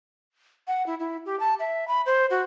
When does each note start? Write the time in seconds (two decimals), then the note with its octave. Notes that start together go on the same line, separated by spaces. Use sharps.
0.67 F#5
0.86 E4
1.00 E4
1.26 G4
1.40 A5
1.60 E5
1.88 B5
2.06 C5
2.30 F#4